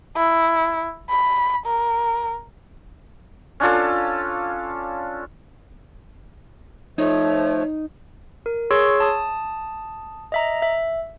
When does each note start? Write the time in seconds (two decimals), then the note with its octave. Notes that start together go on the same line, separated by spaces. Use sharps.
0.16 E4
1.10 B5
1.66 A#4
3.60 C#4 D4 F4 A4
6.98 F3 A3 D#4 C#5
8.46 A#4
8.71 G#4 C#5 C6 C#6 E6
9.00 A5 D#6
10.32 D#5 E5 A#5
10.62 E5